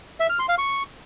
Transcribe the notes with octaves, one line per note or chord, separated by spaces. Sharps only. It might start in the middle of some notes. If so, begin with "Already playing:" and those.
E5
F6
C6
F5
C#6